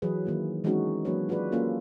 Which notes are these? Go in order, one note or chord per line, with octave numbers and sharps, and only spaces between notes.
E3 F#3 G#4 B4
D#3 A#3 E4
E3 G#3 C4 C#4 D#4 F#4
F#3 A#3 D4 G#4 B4 C#5
F4 F#4 G#4 B4 D5
A#3 C#4 F4 A4